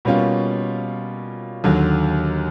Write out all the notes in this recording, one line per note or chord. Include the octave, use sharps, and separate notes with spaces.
B2 G3 A#3 C#4 F4
D#2 D3 F#3